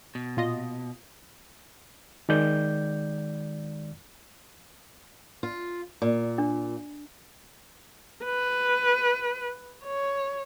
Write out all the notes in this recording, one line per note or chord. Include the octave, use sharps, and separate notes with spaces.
B2
A#2 F4 D#5
D#3 G#3 D5 G6
F4
A#2
D4
B4
C#5